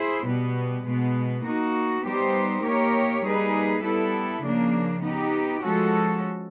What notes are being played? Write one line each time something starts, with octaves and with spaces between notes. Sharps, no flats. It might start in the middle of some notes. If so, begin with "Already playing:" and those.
Already playing: E4 G#4 C5
B2 G3 B3
B2 G#3 B3
A#3 D#4 F#4
G3 B3 D#4 G4 C5
A#3 D#4 G4 A#4 C#5
G3 A#3 D#4 G#4 B4
G3 B3 E4 A4
C#3 F3 A#3 D4
B3 D#4 G4
F3 G#3 C#4 F#4 A4